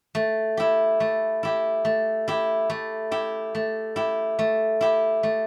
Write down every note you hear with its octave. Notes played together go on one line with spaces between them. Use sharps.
A3
E4 G4
A3
E4 G4
A3
E4 G4
A3
E4 G4
A3
E4 G4
A3
E4 G4
A3